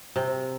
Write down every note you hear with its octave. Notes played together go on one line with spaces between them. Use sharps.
C3